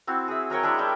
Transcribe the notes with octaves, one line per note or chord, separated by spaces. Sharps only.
C4 E4 F#4
G#4 E5
F#3 A#4 C#5 G5
G#3 D4 E4 D5
G3 C#5 G5